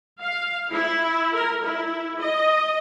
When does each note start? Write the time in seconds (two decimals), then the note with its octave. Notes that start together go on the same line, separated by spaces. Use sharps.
0.21 F5
0.70 E4
1.34 A#4
1.63 E4
2.19 D#5